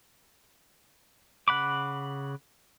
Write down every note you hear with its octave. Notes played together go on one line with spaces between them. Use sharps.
C#3 F#5 B5 D6